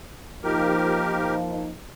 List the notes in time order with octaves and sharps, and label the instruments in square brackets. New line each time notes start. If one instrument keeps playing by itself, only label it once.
[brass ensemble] F3 [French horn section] A#3 D#4 [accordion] G4 A#4